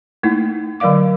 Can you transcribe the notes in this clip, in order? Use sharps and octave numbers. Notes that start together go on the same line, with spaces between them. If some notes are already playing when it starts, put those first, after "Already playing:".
A3 A#3 D#4 E4
D3 F#3 A#4 D5 F5 D6